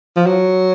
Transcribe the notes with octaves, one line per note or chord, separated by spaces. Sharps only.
F3
F#3